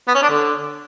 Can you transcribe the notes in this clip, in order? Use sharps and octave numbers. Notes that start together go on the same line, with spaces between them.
B3
C#4
D4
D3